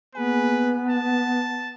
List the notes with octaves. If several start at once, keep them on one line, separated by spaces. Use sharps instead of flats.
A#3 B3 G#4 B4 G#5
F#5 A5